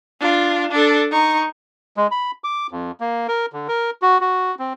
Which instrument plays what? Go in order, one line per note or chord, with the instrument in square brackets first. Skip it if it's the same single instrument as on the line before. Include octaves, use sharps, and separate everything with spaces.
[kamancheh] D4 F4
D4 A4
D#4 C#6
[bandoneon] G#3
B5
D6
F2
A#3
A#4
D3
A#4
F#4
F#4
C4